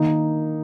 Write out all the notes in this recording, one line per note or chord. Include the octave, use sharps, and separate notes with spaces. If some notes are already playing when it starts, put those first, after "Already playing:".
Already playing: D#3 A#3 D#4